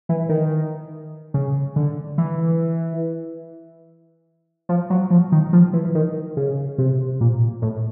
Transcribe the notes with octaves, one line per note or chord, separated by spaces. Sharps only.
E3
D#3
C#3
D3
E3
F3
F#3
F3
D#3
F3
E3
D#3
C#3
C3
A#2
A2